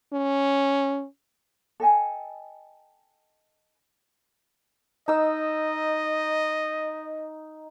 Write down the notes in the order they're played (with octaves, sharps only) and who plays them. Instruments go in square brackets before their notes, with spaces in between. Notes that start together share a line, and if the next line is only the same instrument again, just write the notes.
[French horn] C#4
[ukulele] A4 D#5 G5 G#5
[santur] D#4 E6 [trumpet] D#5